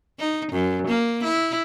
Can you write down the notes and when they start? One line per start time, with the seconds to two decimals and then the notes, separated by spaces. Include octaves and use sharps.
0.19 D#4
0.53 F#2
0.87 A#3
1.24 E4